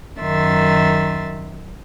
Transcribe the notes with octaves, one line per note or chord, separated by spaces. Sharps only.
F#2 D#3 E5 C6 A6